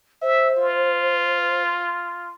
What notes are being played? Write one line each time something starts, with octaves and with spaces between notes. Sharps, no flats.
C5 E5
F4